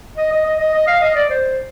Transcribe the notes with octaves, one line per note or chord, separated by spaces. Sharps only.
D#5
D#5
D#5
D#5
D#5
F5
D#5
D5
C5